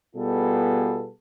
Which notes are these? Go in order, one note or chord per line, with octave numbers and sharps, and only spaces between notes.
B2 G3 B3 F4 G#4 A4